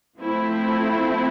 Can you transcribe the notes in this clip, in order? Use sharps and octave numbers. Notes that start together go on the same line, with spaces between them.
F3 A3 C4 E4